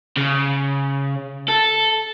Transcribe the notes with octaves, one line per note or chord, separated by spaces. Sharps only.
C#3
A4